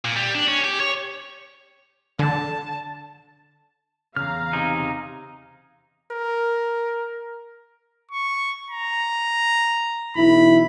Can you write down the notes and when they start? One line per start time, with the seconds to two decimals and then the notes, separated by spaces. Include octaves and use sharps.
0.05 A#2
0.16 G3
0.35 D4
0.48 C#4
0.64 G4
0.80 C#5
2.19 D3 A5
4.17 E2 C#3 F5 A#5 F6
4.53 C3 D#4 G#4
6.11 A#4
8.12 C#6
8.71 A#5
10.16 B1 E3 E4 B5